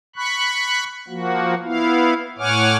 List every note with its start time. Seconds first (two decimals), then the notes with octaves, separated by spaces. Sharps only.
0.16 B5 C#6 F#6
1.08 F3 A#3 F#4
1.64 B3 E4 F5
2.39 A2 C#5 F#5 G#5 D6 F6